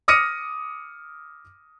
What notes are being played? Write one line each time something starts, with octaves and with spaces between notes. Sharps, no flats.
D6 D#6 F6 A#6 C#7 D#7